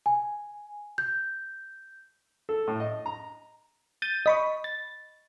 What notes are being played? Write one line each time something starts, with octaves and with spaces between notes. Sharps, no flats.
G#5
G6
A4
A2
D#5
A#5
G6 A6 D#7
D#5 B5 C#6
A6